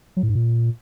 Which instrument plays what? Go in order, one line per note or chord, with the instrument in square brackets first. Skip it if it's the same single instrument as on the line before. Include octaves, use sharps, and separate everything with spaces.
[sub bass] F#3
A2
G#2
A#2